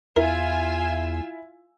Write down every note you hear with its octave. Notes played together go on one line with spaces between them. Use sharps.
E2 E4 F4 A#4 G#5 E6